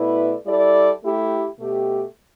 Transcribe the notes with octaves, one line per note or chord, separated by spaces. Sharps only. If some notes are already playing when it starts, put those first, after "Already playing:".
Already playing: B2 A3 E4 B4 D5
G3 E4 A4 D5
A3 E4 G4
B2 A3 G4